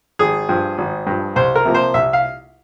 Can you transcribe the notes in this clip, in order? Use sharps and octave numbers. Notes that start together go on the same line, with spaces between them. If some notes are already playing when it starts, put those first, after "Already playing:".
G#1 G#4
G2 F3
G#1
G2 F3
C2 C5
A#4
C3 F3 A#3
C5
C2 E5
F5